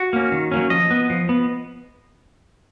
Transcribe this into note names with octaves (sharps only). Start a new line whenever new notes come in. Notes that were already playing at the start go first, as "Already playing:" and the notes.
Already playing: F#4
A#3 C#4
D#3
F#3 A#3 C#4
F3 D#5
B3
F3
B3